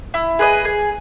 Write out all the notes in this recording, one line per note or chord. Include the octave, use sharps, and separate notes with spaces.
E4
G#4 B4 D#5
G#4